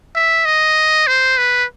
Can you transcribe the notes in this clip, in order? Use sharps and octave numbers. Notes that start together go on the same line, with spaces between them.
E5
D#5
C5
B4